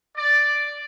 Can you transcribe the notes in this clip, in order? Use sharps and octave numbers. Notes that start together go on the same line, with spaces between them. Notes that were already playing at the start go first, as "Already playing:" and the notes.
D5